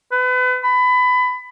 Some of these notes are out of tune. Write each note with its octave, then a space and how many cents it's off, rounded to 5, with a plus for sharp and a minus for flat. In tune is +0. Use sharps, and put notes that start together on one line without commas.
B4 +35
B5 +20